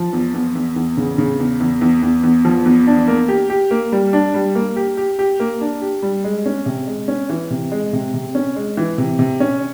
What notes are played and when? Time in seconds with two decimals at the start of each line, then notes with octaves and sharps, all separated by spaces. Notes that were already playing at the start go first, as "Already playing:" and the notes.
Already playing: F3
0.13 E2
0.34 E2
0.55 E2
0.76 E2
0.97 C#3
1.18 C#3
1.39 E2
1.60 E2
1.81 E2
2.02 E2
2.23 E2
2.45 F3
2.66 E2
2.87 D4
3.08 A#3
3.28 G4
3.50 G4
3.71 A#3
3.92 G3
4.13 D4
4.34 G3
4.55 A#3
4.76 G4
4.97 G4
5.19 G4
5.40 A#3
5.61 D4
5.82 G4
6.02 G3
6.24 G#3
6.46 C#4
6.66 C3
6.87 G#3
7.08 C#4
7.30 E3
7.51 C3
7.72 G#3
7.93 C3
8.14 C3
8.35 C#4
8.56 G#3
8.77 E3
8.98 C3
9.19 C3
9.40 C#4